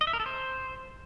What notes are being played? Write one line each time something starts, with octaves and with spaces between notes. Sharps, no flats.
D#5
E5
A#4
A4
C5